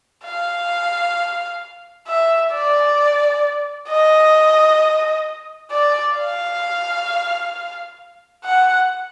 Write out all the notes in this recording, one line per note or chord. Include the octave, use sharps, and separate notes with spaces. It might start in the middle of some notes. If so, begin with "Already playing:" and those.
F5
E5
D5
D#5
D5
F5
F#5